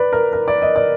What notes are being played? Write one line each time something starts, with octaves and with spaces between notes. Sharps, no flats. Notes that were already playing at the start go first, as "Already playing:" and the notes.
Already playing: B4 D5
A#4
A#4
D5
D#5
D5